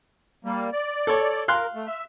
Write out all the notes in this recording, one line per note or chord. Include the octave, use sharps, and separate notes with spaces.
G3 A#3
D5
A4 C#5
A#4 F5 C6 F#6
A3
E5